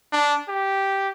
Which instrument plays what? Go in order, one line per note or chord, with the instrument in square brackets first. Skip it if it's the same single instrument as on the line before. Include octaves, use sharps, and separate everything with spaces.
[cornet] D4
G4